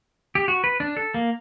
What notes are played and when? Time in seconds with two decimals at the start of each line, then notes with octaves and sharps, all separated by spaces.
0.35 G4
0.48 F#4
0.64 B4
0.80 D4
0.97 A4
1.14 A#3